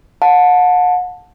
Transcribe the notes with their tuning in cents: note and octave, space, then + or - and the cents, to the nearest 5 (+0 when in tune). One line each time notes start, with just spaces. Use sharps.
F#5 -40 A5 +0